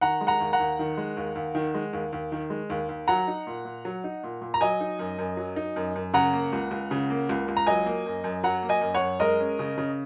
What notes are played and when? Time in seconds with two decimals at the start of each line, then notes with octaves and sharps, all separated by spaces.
0.01 D#3 F#5 A#5
0.21 G#3
0.27 F#5 A#5
0.40 D#2
0.53 F#5 A#5
0.60 D#2
0.79 D#3
0.98 G#3
1.17 D#2
1.35 D#2
1.55 D#3
1.75 G#3
1.93 D#2
2.13 D#2
2.32 D#3
2.50 G#3
2.70 D#2
2.89 D#2
3.08 F#3 F#5 A#5
3.27 D#4
3.47 A#2
3.65 A#2
3.85 F#3
4.04 D#4
4.23 A#2
4.41 A#2
4.54 A#5
4.61 F#3 D#5 G#5
4.80 D#4
4.99 F#2
5.19 F#2
5.37 F#3
5.56 D#4
5.76 F#2
5.96 F#2
6.14 C#3 F#5 A#5
6.33 A#3
6.53 C#2
6.71 C#2
6.91 C#3
7.10 A#3
7.29 C#2
7.48 C#2
7.57 A#5
7.67 F#3 D#5 G#5
7.86 A#3
8.06 F#2
8.24 F#2
8.43 F#3 F#5 A#5
8.63 A#3
8.69 D#5 G#5
8.81 F#2
8.94 C#5 F#5
9.01 F#2
9.20 G#3 A#4 D#5
9.40 C#4
9.59 C#3
9.78 C#3